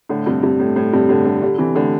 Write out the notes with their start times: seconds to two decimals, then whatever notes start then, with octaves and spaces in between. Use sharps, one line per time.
0.09 A2 D3
0.26 G2 C3
0.43 G2 C3
0.60 A2
0.76 A2
0.93 G2 C3
1.09 A2 D3
1.25 D3 G3
1.42 D3 G3
1.58 C3 E3
1.75 A2 D3